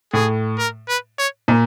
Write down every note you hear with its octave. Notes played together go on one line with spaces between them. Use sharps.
A2 G#4
A#4
B4
C#5
A#2